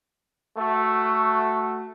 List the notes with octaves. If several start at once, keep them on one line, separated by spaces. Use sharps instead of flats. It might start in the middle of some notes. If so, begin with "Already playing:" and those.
A3 F#4